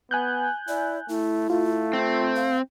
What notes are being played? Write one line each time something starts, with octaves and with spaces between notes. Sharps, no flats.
B3 G#5 F#6 G6
E4 D5
A3 E4
A3 F4
C4
F5